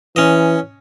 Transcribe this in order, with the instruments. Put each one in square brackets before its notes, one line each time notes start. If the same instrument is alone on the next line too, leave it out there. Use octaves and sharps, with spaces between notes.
[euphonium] E3 [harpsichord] C#4 D#5